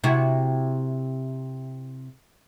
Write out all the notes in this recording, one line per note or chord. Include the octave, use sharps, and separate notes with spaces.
C3 E4 F#4